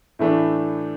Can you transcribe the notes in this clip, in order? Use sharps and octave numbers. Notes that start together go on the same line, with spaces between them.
A2 E3 A3 D4